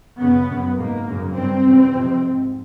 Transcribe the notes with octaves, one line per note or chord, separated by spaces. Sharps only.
F#2 C#3 B3
F#2 C#3
G#2 A#3
F#2 C#3
G2 C4
E2 C#3
F2 C3
G#2